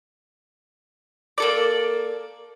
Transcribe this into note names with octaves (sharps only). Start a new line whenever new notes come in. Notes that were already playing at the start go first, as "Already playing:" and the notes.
A#3 A4 D5